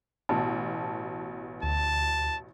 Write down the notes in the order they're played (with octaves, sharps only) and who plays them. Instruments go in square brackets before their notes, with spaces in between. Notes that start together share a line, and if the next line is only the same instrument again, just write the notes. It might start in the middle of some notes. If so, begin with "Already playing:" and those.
[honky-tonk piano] A1 B2 [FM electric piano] A5
[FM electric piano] D2 [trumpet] A5